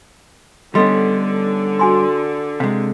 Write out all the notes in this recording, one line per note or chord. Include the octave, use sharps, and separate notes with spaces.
D3 G3 B3 C#4 A4 D#5 C6
F#4 G#5 C6
C3 G#3 F5